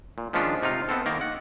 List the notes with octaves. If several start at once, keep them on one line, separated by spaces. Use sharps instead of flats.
A#2
D#3 F3 G#3 C#4 D4 F4
C3 D#4 F4 F5
B3 C4 A4
D#3 A#3 A#4
F#5